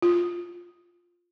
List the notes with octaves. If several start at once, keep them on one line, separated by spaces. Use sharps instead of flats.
F4